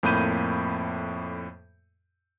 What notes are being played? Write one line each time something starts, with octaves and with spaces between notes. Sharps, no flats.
F2 A2 A#3 B5 G6 D#7